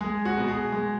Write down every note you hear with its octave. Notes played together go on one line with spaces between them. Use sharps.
G#3 G#4
F#4
B2
G#4
G#3